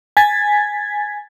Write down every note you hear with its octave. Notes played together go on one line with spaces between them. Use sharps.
G#5 G#6 A6 B6